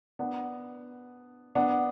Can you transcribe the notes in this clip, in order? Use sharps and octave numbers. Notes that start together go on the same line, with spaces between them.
B3 D4
B3 D4